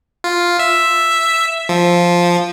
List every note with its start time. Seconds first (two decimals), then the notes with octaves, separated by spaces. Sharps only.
0.24 F4
0.59 E5
1.69 F3